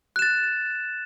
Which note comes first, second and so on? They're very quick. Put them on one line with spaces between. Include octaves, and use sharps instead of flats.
F#6 E7 A6